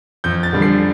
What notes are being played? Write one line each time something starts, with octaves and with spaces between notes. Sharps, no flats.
F2 G6
A6
D3 G3
C7